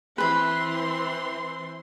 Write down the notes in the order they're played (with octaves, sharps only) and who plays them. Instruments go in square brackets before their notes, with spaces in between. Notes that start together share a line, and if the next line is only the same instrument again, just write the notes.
[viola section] E3 C4 C6 [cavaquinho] B4 B5